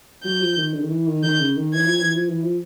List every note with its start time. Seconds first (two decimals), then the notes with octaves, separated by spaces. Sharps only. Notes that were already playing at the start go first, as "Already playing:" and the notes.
0.23 F#3 G6
0.41 F3
0.57 D#3
0.73 D3
0.82 D#3
0.90 E3
1.07 D#3
1.23 D#3 G6
1.40 C#3
1.57 D#3
1.74 E3 G#6
1.87 F3
2.02 E3
2.15 F3
2.29 E3
2.44 F3